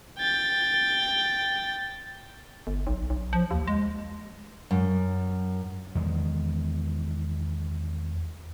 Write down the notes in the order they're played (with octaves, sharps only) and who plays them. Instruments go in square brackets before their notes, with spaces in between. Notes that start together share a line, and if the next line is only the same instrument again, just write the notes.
[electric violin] G5 A6
[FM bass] G1
B1
B1
F3
D#2
G#3
[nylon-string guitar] F#2
[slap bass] E2 D#3 G#3